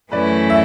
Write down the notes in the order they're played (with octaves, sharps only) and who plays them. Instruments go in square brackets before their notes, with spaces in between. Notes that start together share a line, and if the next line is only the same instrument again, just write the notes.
[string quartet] F#2 E3 A3 C#4 E4 [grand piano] B4 D5
[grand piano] E5